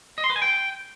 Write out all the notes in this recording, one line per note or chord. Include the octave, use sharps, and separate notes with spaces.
D#5
C6
B4
G#5
G5